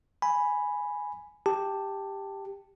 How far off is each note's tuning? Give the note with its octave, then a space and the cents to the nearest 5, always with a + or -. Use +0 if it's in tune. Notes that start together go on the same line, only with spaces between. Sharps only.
G#5 +0 B5 +0
G4 +5 A5 +5